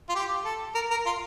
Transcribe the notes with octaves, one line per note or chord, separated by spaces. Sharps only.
F4
G4
A4
A#4
A#4
F4